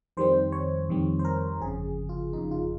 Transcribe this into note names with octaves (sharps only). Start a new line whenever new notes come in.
F2 D#3 G3 C4 C5
C#5
F2 D#3 G3 C4
C5
A#4
G1 F2 C#3 G#4
F4
G1 F2 C#3 D#4
F4